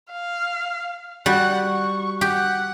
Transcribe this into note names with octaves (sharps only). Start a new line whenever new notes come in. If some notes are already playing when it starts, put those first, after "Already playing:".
F5
G3 F#4 F#5
C#6
G4 F#5